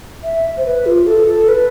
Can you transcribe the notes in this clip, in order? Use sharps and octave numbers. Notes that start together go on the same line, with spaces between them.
E5
C5
B4
F4
A4
A4
B4